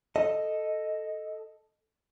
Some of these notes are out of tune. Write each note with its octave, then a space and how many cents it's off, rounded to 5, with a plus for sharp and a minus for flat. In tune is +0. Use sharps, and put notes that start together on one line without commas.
A4 +0 D#5 +0